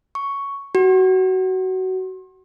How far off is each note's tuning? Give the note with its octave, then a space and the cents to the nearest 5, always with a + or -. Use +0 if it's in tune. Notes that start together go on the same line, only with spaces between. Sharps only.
C#6 +5
F#4 +20